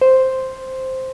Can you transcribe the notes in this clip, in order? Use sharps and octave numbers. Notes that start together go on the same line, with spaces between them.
C5